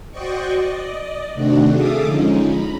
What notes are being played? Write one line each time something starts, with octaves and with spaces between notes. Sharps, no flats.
F#4 C5 D5 D#5 G5 C#6
D5 D#5
C3 D#3 A3 C4 D4 F#4
G#4 A4 E5 F5 D6 D#6
D3 F3 G#3 C#4 D#4
A#5 B5